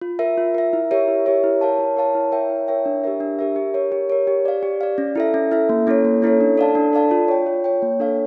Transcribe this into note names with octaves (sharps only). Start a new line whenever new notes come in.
F4
A#4 E5
F4
A#4 E5
E4
G4 A#4 C#5 E5
E4
G4 A#4 C#5 E5
E4
A#4 C#5 F5 A5
E4
A#4 C#5 F5 A5
E4
A#4 C#5 E5 G5
E4
A#4 C#5 E5 G5
D4
G4 A#4 E5
D4
G4 A#4 E5
G4
A#4 C#5
G4
A#4 C#5
G4
D5 F5
G4
D5 F5
C#4
E4 A4 E5
C#4
E4 A4 E5
A#3
C#4 E4 A4 C#5
A#3
C#4 E4 A4 C#5
D4
A4 D5 F5 A5
D4
A4 D5 F5 A5
F4
C#5 G5
F4
C#5 G5
A#3
D4 A4 C#5 F5